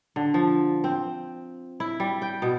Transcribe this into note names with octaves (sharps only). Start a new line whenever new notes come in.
D3
F3
C4
E4
G3
G5
B2